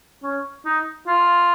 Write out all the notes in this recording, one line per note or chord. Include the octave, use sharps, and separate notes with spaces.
C#4
D#4
F4